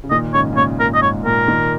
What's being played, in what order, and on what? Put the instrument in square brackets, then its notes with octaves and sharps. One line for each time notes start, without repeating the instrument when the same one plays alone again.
[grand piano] C#3
[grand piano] A#2 D#3 [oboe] D#5
[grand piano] G#2 C#3 [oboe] C#5
[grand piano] C#3
[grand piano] A#2 [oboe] C#5
[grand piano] A#2 [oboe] A#4
[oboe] D#5
[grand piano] G#2 [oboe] C#5
[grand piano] A#2 [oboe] A#4
[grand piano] A#2 D#3